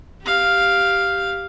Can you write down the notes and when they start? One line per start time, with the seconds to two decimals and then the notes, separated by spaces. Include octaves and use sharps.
0.22 G4 F5